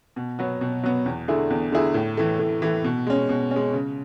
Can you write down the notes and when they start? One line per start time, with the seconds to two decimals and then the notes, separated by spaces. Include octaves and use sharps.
0.16 B2
0.39 F#3 B3
0.61 B2
0.83 F#3 B3
1.06 E2
1.28 D3 A3 E4 G#4
1.50 E2
1.72 D3 A3 E4 G#4
1.94 A2
2.17 E3 A3
2.39 A2
2.62 E3 A3
2.84 B2
3.07 G#3 C#4
3.29 B2
3.51 G#3 C#4
3.73 C#3